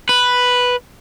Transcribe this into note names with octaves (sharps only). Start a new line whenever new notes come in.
B4